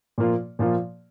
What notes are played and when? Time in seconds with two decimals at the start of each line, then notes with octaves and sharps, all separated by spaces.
0.18 A#2 F3 A#3 F4
0.59 A#2 F3 A#3 F4